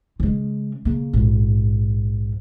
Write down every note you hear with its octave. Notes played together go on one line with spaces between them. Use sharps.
C#3 G#3
C#3 A#3
A#1 G#2